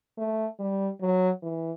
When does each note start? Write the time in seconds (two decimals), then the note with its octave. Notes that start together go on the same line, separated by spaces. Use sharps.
0.18 A3
0.59 G3
1.01 F#3
1.43 E3